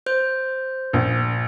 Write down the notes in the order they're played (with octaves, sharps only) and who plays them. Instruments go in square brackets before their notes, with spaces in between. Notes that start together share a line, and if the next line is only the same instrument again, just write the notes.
[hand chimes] C5 G6
[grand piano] A#1